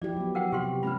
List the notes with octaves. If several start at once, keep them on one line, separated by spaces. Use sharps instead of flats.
F3 E4 G4 D5
F#3 B3
A#4 F#5 G5
C3 G4 C6
G#3 C#4 G4 B4 B5